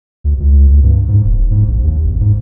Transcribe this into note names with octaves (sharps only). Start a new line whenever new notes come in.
D2
C#2
D2
G2
G#2
D#1
D1
G#2
A#1
D#2
G#1
G#2